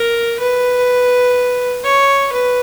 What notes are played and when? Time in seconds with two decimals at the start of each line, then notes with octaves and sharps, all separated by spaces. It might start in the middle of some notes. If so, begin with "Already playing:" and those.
Already playing: A#4
0.39 B4
1.84 C#5
2.31 B4